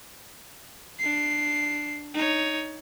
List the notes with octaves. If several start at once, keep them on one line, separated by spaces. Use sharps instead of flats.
D4 C7
D#4 C#5